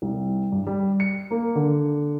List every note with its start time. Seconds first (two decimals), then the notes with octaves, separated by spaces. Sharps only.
0.02 C2
0.52 G2
0.67 G3
1.00 C#7
1.31 A#3
1.55 D3